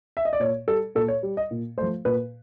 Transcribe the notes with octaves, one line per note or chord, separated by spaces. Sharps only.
E5
D#5
D5
A#2 C#5
G3 A4
A#2 A4
C#5
G3
D#5
A#2
A3 C5
F3
A#2 B4